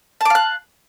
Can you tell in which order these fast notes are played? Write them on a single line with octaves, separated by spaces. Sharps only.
A5 D6 F5 F#6